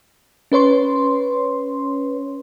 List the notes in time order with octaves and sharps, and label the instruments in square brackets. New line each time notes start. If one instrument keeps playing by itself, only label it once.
[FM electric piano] C#4 B4 C#5 C6